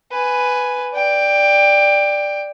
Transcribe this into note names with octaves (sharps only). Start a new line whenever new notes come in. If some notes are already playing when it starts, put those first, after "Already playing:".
B4 G#5
D5 G5